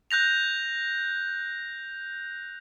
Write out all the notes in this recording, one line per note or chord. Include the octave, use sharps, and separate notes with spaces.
F#6 G6 A#6 F7